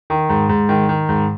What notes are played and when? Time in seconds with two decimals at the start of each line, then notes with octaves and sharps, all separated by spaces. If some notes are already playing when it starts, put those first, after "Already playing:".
0.10 D#3
0.29 G#2
0.49 G#2
0.69 D#3
0.89 D#3
1.09 G#2